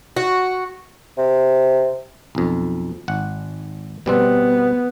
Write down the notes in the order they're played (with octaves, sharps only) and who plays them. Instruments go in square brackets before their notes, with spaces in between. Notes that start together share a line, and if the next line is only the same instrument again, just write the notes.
[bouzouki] F#4
[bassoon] C3
[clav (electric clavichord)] B1 F2
G#1 F#5
[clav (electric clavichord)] B2 G3 C4 [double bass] B3